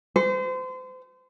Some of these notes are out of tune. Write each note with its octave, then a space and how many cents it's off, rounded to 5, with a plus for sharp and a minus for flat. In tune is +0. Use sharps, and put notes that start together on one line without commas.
C5 -35